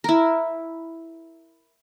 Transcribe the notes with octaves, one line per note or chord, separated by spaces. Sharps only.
E4 A#4